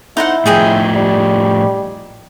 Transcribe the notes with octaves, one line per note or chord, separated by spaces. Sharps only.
D#4 E4 C5 F#5
A2 F3 D#4 G#4 G5
G3